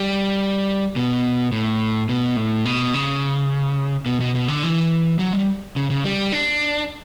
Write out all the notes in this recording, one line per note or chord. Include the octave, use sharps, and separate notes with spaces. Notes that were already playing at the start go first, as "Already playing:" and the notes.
Already playing: G3
B2
A2
B2
A2
B2
C#3
B2
B2
B2
D3
E3
F#3
G3
C#3
C#3
G3
D4